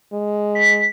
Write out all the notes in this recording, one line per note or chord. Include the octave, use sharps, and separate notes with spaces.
G#3
B6